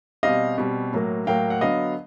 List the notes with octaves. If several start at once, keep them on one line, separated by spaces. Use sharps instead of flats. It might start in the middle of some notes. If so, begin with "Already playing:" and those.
B2 G3 C4 D#5 F5
B2 G3 C4
A2 F#3 A#3
A2 F#3 A#3 F5 G5
F#5
D3 F#3 B3 D#5 F5